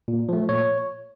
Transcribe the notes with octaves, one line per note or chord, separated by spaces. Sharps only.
A#2
F3 A3
A#2 C#5